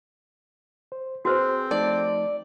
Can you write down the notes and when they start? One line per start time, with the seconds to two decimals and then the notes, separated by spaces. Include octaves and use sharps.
0.92 C5
1.25 C4 F#4 G#4 B4 C5
1.71 F3 A3 D#4 D5 A5